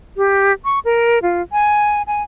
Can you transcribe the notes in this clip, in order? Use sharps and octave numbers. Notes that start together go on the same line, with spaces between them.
G4
C#6
A#4
F4
G#5
G#5